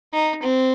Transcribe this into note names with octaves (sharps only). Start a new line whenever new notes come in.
D#4
C4